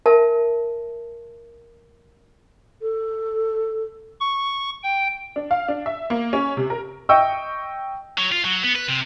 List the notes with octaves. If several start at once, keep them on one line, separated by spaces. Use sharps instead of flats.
A#4 E5 A5
A4
C#6
G5
D4
F5
D4
E5
A#3
C#4
C3
A#4
D#5 G5 C#6 E6
F#3
F4
F#3
B3
B4
C3